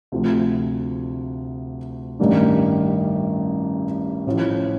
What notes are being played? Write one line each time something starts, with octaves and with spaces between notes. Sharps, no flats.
D2 C3 F3
A1 G2 D#3 G3 D4
A1 A2 F3